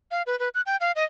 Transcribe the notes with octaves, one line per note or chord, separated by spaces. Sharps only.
F5
B4
B4
F#6
G5
F5
D#5